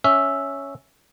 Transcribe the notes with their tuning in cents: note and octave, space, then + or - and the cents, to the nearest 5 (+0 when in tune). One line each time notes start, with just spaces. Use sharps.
C#4 +0 E5 +0